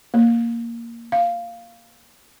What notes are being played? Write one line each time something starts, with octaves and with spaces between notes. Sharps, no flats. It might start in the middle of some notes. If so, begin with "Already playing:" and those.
A#3
F5